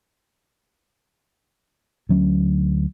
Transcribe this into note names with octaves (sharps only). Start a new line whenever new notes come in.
D2 F#3 C#4